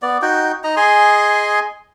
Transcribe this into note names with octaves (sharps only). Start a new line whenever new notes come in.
B3 D5
D#4 F#4 G5
D#4 D#5 A#5
G#4 D#5 G#5 C6